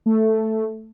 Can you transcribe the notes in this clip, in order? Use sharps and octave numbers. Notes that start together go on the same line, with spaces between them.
A3